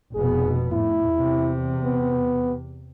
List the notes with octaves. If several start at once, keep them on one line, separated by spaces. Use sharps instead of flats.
F1 B2 B3 G#4
A2 E4
E2 C3
B3